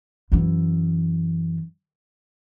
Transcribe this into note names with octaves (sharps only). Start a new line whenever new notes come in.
F#2 E3